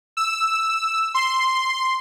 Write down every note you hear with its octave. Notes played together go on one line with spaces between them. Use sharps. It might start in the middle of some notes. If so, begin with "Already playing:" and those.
E6
C6